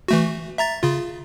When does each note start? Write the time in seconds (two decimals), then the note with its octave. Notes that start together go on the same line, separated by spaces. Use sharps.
0.08 E3 A3 F#4
0.58 E5 A#5 A6
0.83 C#3 F4